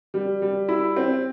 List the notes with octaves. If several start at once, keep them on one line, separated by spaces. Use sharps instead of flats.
G3
G3
E4
C4